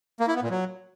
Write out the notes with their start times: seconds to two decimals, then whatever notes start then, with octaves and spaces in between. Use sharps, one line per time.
0.20 A#3
0.28 E4
0.35 B3
0.43 A#2
0.50 F#3